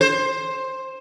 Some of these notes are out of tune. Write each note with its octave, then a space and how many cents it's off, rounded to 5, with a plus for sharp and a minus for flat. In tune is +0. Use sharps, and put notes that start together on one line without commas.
C5 +10